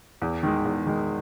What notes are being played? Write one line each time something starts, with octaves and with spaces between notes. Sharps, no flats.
E2
D#3 G#3
E2
D#3 G#3